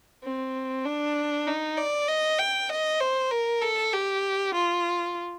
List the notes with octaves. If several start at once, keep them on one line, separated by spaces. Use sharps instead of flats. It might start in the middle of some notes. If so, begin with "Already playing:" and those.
C4
D4
D#4
D5
D#5
G5
D#5
C5
A#4
A4
G4
F4